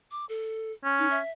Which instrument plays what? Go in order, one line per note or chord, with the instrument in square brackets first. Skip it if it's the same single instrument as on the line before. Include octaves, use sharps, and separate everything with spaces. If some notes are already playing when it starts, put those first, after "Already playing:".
[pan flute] D6
A4
[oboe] C#4
[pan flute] D#4
E5